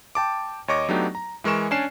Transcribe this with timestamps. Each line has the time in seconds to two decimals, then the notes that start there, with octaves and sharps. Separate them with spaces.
0.15 G5 A5 D6
0.68 D#2 C#5 D#5 C#6 D6 A#6
0.89 F#3 A3 B3 D4 D#4 G4
1.15 A#5
1.44 E3 G#3 A#4 C#6 E7
1.71 C#4 D4 D5 G#5 C7 E7